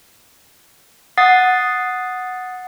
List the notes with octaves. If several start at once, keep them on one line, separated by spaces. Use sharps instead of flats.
F#5 D#6 A6 C7